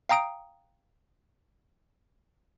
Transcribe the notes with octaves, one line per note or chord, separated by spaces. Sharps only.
F5 G5 A#5 D#6 D7